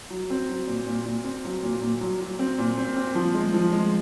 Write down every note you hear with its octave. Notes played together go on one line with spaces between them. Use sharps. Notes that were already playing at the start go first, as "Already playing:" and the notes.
F#3
C4
F#3
A#2
A#2
A#2
C4
F#3
A#2
A#2
F#3
F#3
C4
A#2
C4
C4
F3
G#3
F3
G#3